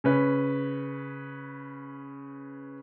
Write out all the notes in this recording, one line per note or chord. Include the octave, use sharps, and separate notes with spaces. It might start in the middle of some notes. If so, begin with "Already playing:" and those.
C#3 C#4 B4